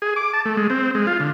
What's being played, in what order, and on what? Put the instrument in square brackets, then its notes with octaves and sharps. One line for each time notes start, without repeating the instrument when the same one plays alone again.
[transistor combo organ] G#4
D6
A5
A3
G#3
C4
G#3
F4
D3